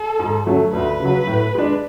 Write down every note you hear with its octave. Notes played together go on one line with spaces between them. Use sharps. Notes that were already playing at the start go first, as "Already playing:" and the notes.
Already playing: A4
G#2
F#3 A3 C#4
D2 B4
C#3 F#3
A2
G#3 D4